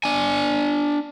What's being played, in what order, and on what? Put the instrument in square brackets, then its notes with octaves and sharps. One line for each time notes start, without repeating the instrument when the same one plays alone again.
[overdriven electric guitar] D4 G#5